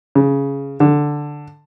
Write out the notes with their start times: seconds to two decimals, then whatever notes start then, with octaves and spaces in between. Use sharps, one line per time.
0.15 C#3
0.80 D3